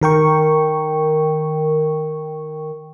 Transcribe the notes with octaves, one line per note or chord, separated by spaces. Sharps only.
D#3 A#4 G5 C#6